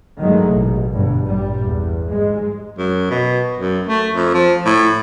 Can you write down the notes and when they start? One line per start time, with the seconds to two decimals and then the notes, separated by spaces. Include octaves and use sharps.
0.21 G2 D#3 F#3 G#3 A3
0.50 A1 B2
0.94 G1 G2 B2
1.25 A1 A#2 G3
1.64 E2
2.13 G#2 G#3
2.79 F#2
3.10 B2
3.57 F#2
3.87 A3
4.13 F2
4.34 F3
4.65 A2